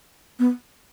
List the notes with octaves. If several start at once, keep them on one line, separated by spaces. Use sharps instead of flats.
B3